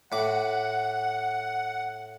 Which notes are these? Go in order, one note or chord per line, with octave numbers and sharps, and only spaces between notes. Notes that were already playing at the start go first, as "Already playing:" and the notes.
A2 F#5 D6